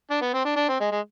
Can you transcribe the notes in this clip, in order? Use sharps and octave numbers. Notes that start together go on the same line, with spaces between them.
D4
B3
C4
D4
D4
C4
G#3
G#3